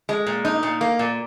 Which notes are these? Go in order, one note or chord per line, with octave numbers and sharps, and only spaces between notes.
G#3
A#2
D#4
A#2
A#3
A#2